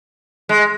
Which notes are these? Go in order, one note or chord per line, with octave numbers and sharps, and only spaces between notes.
G#3